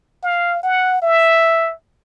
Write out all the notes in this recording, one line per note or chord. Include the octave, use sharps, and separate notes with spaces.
F5
F#5
E5